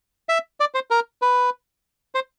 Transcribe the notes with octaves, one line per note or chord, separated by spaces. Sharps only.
E5
D5
C5
A#4
B4
C5